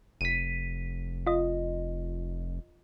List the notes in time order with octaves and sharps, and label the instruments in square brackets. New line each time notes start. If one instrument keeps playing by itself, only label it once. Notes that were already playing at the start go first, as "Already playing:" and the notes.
[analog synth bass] F1 [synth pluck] B6 D#7
[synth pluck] F4 D#5